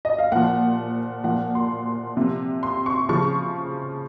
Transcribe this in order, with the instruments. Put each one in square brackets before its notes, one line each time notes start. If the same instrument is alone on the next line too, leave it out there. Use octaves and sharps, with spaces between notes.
[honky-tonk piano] D#5
F5
A#2 F3 F#5
A#2 F3 F#5
C6
C3 F3
C6
C#6
C#3 F3 C#6